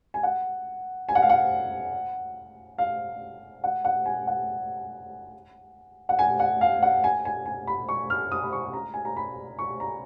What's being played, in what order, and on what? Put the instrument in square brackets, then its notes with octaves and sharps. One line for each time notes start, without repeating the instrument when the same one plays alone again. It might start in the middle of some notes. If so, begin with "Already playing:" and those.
[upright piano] G#5
F#5
G#5
F#5
F5
F#5
F5
F#5
F#5
G#5
F#5
F#5
G#5
F#5
F5
F#5
G#5
G#5
G#5
B5
C#6
F6
D#6
B5
C#6
A#5
G#5
A#5
B5
C#6
A#5